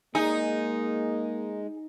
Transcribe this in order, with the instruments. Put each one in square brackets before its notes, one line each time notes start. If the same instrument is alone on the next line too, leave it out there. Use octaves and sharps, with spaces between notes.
[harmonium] G#3 [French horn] A#3 [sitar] D#4 [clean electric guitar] G#4